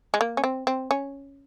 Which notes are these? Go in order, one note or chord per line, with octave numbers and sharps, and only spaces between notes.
G#3
A#3
C#4
C4
C4
C#4